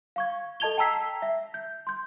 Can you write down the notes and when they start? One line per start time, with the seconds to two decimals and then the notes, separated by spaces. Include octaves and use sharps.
0.16 F5 C#6 G#6
0.60 A4 D#5 A5 G#6 F7 G7
0.78 G5 A5 A#5 E6 B6 C7
1.22 E5
1.54 G6
1.87 C6 G6